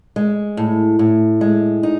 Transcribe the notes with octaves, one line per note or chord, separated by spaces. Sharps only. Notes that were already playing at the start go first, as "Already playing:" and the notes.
G#3
A2
A2
G#3
D#4